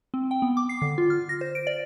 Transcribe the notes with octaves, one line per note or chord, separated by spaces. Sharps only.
C4
G5
B3
D6
C7
D3
F4
F6
A#6
C5
D7
D5